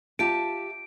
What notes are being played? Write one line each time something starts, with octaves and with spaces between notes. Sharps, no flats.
F4 G4 E5 A5 D7